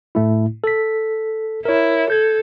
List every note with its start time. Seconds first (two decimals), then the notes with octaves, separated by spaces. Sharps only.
0.15 A2 A3 E4
0.64 A4 B6
1.65 E4 A#4 C#5
2.10 A4 G6 G#6